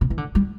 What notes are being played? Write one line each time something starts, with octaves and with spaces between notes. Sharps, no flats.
C3
E3
D3
G3